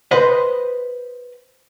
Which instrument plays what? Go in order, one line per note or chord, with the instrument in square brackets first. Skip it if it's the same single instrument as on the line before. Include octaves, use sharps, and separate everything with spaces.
[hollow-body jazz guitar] B4 C5 D#5